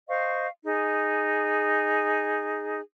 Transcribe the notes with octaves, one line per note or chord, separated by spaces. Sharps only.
C5 D#5 F5 C#6
D#4 G#4